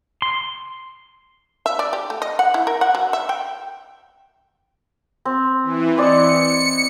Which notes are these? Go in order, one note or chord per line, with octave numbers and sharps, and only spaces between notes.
C6
E5
D5
G4
A3
D#5
F#5
E4
A#4
F#5
F#3
E5
G5
C4
E3
C4 D5 D#5 C#7